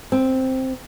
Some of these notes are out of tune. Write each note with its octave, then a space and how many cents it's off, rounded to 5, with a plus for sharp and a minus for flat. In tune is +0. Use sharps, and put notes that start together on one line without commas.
C4 +0